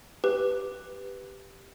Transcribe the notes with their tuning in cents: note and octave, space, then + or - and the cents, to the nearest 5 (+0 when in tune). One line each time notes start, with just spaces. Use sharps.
G4 +0 B4 +0